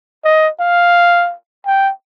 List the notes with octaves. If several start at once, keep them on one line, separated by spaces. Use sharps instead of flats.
D#5
F5
G5